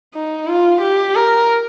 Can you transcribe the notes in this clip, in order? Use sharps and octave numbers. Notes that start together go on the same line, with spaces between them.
D#4
F4
G4
A#4